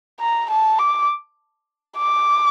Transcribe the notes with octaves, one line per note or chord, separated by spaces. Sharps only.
A#5
A5
D6
D6